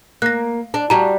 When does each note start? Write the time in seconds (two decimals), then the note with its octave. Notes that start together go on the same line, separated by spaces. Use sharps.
0.22 A#3 F#6 A#6
0.74 D4
0.90 G3 F#4 A5 A#5